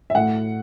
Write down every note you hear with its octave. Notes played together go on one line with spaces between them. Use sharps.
E5
A2 A3 F#5